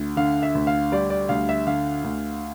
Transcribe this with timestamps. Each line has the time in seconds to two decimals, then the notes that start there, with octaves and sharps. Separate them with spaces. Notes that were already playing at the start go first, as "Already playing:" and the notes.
Already playing: D2
0.16 D3 F5
0.43 E5
0.55 D2
0.67 F5
0.92 G3 D5
1.10 D5
1.29 D2 F5
1.49 E5
1.67 D3 F5
2.04 D2